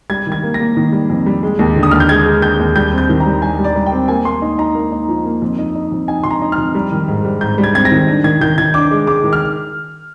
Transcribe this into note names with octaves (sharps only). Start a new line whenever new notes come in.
G3 G#6
D#3
G#6
A#3
A#6
A#3
D#3
G3
F2
G3
G#3
D#2
D3
D#6
D#2 F6
G6
G#3 G#6
G#3
G#3 G6
D#2
G3 G6
C4
G6
D#3
A#5
G3
G3 G#5
G3
D5
G3
G5
C4
A#3 G#5
A#3 C6
D#4
D#4 A#5
A#3
D#4
F3
A#3
F2
D#4
D#4
F2
D#4 G#5
F2 C6
A#5
D#4
F6
F2
G3
D#3
G#2
G3
G#2 G6
G3
G#6
C4 G#6
A#6
D#3
D4
D#3 G#6
D#3 G6
D#3 G#6
D4 D6
G#3
G#3 D6
D#3
F6